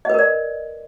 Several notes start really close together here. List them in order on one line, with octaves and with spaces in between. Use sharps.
D#5 B4 A#4 D5